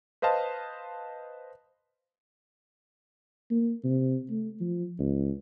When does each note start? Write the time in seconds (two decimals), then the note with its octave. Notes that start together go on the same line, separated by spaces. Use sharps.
0.22 B4 C5 D#5 F5 A5
3.51 A#3
3.84 C3
4.30 A3
4.60 F3
4.99 C#2